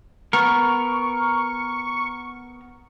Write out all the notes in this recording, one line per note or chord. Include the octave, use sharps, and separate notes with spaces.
B3 A#4 C#6